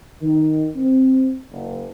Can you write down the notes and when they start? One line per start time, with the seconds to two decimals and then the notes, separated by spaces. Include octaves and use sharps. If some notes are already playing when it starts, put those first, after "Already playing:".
0.21 D#3
0.75 C4
1.51 F#1